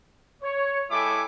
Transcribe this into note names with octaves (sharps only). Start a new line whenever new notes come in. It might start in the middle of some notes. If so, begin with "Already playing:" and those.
C#5
G#3 E4 G4 A4 G#5 D6